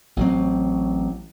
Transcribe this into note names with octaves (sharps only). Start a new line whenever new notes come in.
A1 F#3 A3 C4